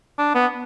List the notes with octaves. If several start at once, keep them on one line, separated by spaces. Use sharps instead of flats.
D4
B3